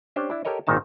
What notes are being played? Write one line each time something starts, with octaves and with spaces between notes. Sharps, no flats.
C#4 D4 G4 C5
D4 E4
G4 A4 A#4 C#5 D#5
G#1 A#2 D#3 D#4 A5